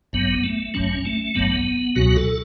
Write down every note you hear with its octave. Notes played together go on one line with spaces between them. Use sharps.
A1 G2 F#3 B3
A3
A1 G2 F#3 C#4
A3
A1 G2 F#3 B3
C#2 B2 F#3 F#4
A4